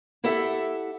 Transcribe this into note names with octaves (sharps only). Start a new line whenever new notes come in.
E4 G4 A4 E5 F#5